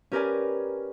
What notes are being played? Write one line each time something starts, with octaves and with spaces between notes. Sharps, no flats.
C#4 G4 A#4 B4 D5 G#5